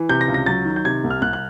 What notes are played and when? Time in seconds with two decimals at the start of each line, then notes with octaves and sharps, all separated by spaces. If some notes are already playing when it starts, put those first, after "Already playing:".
Already playing: E3
0.09 C3 G6
0.21 A#6
0.28 C#2
0.34 A#6
0.46 F#3 A6
0.65 D#3
0.76 G6
0.85 C3 G#6
1.04 C2
1.10 F6
1.22 C2 F#6
1.33 F#6